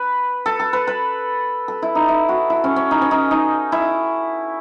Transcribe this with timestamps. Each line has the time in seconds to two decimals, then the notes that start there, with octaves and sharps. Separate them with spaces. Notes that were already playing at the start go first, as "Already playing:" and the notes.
Already playing: B4
0.46 A4
0.60 A4
0.73 B4
0.87 B4
1.68 A4
1.82 E4
1.95 D#4
2.08 E4
2.29 F#4
2.50 E4
2.64 C#4
2.76 C#4
2.91 D#4
3.01 C#4
3.11 D#4
3.31 D#4
3.72 E4